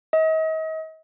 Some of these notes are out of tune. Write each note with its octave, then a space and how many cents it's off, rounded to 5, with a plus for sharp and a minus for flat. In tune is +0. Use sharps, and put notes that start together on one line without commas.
D#5 +40